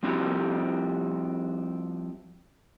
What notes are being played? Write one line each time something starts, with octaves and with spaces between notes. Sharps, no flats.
F3 G3 C4 E4 F#4 G4